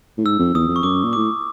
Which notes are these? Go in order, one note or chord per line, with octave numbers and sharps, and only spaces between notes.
A2
G#2 E6
F2
E2 D#6
F2
C#6
F#2 D6
A#2
A2 D6